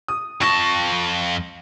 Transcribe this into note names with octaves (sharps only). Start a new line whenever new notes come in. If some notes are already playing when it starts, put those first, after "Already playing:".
D#6
F2 A5 C#6 A#6